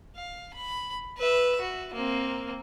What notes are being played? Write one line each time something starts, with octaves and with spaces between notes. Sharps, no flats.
F5
B5
B4 E5
F#4
A#3 C4